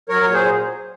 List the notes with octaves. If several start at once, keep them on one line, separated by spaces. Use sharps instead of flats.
F#3 A#4 C#5
A#2 C#5
G#4 C5
A#2